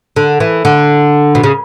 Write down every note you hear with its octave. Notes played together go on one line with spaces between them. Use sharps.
D3
E3
D3
B2
C#3